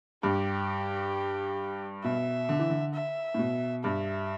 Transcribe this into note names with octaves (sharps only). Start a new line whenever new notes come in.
G2 G4
B2 E5
D3
E3
D3
E5
A2
B2
G2 E5